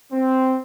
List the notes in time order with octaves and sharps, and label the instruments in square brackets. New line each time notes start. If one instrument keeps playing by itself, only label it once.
[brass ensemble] C4